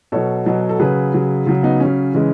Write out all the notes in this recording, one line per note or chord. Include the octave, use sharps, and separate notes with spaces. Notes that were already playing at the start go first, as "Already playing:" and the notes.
B2 F#3 A4 C#5
B2 F#3
A4
C#3 F#3 G#4 B4
C#3 F#3
C#3 F#3
B3 D#4
C#3 F#3 C#4
C#3 E3 G#3